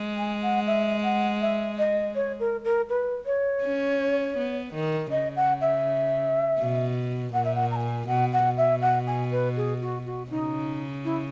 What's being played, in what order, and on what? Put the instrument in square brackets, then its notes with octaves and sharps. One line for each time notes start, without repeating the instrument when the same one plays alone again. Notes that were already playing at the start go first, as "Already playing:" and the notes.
Already playing: [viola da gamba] G#3
[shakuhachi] G#5
F#5
E5
F#5
E5
D#5
C#5
A#4
A#4
B4
C#5
[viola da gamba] C#4
B3
D#3
[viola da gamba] C#3 [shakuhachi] D#5
[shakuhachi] F#5
E5
[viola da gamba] B2
[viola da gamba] A#2 [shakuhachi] F#5
[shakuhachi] E5
F#5
A#5
G#5
[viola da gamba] B2 [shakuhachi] F#5
[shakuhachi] F#5
[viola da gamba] B2
[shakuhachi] E5
F#5
G#5
B4
G#4
F#4
F#4
[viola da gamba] C#3 [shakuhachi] D#4
[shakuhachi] E4